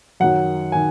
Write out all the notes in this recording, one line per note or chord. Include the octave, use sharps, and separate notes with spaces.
F#2 D#3 F#3 F#5
D#3 G#5